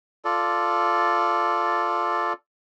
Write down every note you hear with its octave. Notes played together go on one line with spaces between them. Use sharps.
F4 A4 D5